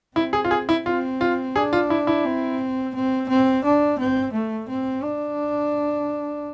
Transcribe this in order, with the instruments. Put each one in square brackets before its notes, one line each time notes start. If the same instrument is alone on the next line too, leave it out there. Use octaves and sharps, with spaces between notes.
[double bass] C4 [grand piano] E4
[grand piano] G#4
F4
G#4
E4
[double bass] C4 [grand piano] F4
[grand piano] F4
[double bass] D4 [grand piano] G#4
[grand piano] F4
E4
E4
[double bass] C4
C4
C4
D4
C4
A3
C4
D4